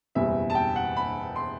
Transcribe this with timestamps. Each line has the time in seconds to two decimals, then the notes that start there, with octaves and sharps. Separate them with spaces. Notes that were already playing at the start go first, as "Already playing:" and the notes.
0.15 F#1 E2 B2 G3 E5
0.50 A5
0.55 G5
0.76 F#5
0.96 B5
1.36 C6